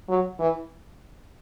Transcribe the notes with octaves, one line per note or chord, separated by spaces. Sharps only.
F#3
E3